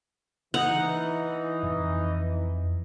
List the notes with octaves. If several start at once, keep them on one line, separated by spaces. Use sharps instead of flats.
E3 D#4 F#5
F2